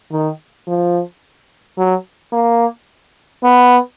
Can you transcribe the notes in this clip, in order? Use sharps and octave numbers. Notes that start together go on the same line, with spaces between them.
D#3
F3
F#3
A#3
B3